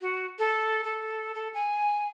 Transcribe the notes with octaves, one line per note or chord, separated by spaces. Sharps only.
F#4
A4
A4
A4
G#5